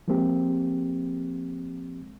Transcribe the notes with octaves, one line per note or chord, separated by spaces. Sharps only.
F3 G#3 A#3 C4 G4